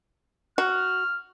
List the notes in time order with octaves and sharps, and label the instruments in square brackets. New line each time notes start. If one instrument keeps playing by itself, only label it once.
[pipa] F#4 [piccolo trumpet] F6